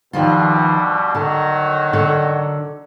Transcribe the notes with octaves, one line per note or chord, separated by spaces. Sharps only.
G2 B2 D#3 F3 G3 F4
D3 D#3 F#3
D3